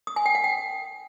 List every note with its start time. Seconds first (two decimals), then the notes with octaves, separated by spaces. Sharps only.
0.07 D#6
0.16 G#5
0.26 G5
0.35 F#5
0.44 G5